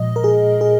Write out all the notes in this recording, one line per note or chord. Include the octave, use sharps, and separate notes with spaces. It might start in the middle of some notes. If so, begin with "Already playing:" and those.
Already playing: A#2 F3 G#3 D#5
A#4
G#4
G#4